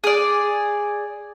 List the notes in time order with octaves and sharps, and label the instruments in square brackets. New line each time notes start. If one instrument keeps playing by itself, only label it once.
[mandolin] G#4 D5